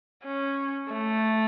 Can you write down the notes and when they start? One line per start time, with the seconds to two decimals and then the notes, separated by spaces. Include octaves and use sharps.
0.24 C#4
0.92 A3